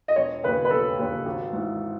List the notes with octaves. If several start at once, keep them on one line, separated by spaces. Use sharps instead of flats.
D#5
E1 C#5
D#2 C#3 B4
B4
E1 A4
D#2 C#3
G#1
G#2 E3